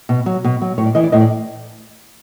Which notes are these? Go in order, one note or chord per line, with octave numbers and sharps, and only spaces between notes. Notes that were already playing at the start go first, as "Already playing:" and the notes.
B2
F#3
B2
F#3
A2 C#5
D5
E3 D#5
D5
A2 D#5
D5